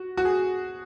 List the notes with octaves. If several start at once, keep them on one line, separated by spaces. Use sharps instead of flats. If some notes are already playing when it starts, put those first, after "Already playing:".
Already playing: F#4
F#4
G#4